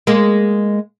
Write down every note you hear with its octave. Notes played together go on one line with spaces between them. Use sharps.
G#3 A#3